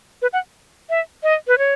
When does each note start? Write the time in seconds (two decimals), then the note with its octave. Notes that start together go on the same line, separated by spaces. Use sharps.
0.22 B4
0.33 F#5
0.90 E5
1.23 D#5
1.48 B4
1.58 C#5